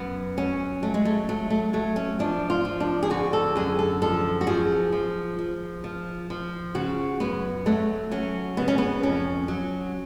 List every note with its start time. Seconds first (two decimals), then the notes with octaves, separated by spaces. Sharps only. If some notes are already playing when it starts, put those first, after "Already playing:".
Already playing: F#2 B3
0.37 F#3 C#4
0.83 F#3 A3
0.94 G#3
1.05 A3
1.29 F#3 A3
1.50 A3
1.73 F#3 A3
1.96 C#4
2.19 F3 D4
2.50 F4
2.65 F3
2.80 D4
3.03 G#4
3.10 D3 F#4
3.33 A4
3.56 F#2 G#4
3.79 A4
4.02 F3 A4
4.41 F#4
4.47 F3 G#4
4.92 F3
5.39 F3
5.84 F3
6.30 F3
6.75 C#3 F#4
7.20 F#2 B3
7.66 F#3 A3
8.12 F#3 C#4
8.57 C#3 B3
8.68 C#4
8.78 B3
9.03 F2 C#4
9.48 F#3